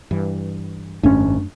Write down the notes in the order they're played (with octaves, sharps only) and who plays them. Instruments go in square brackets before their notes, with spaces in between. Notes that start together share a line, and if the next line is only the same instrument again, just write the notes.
[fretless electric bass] G2 E3
[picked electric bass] G#1 C#4 [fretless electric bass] F#2 A3 D4